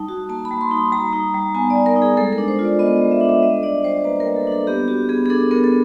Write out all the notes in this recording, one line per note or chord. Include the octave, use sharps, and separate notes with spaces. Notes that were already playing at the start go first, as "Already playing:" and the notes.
Already playing: G3 D#4 A5
F#4
A#3 A5
B5
G3
C6
D#4
B5
G3 A#5
D#4
G3
B3 G#5
D5
G3
A#4
D#4
G#4
G#3 A4
A#4
D4
C5
F4
D5
B3 D#5
G#3
E5
D4 D#5
E5
G3 D#5
D4 D5
G3 C5
A#3 B4
A#4
G3
A4
D4 A4
B3 G4
F#4 G4
B3 G#4
G#4
D4 A4
B3 A#4
A4